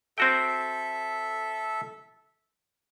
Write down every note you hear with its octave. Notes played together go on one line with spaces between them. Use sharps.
C4 F#4 A4 E5 G5